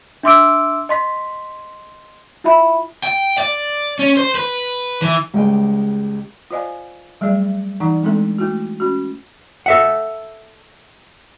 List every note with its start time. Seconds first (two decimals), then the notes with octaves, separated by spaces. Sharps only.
0.23 D4 E5 C6 D6 E6 D7
0.89 D#5 C6 B6
2.44 E4 F4 E5 B5
3.03 G5
3.38 D5
3.99 C#4
4.17 C5
4.35 B4
5.02 E3
5.34 C#2 G3 G#3 G5 G#5
6.51 F4 C5 D5 D#5 F5 G#5
7.21 F#3 G3 A3 G#4 D5
7.80 E3 D#4 D5 F#5 A#5
8.03 G#3 A3 C4 D4 A4
8.38 A3 E4 F#4
8.80 C#4 F#4
9.66 A4 E5 F#5